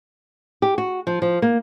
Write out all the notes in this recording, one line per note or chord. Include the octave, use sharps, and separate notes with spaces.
G4
F#4
F3
F3
A#3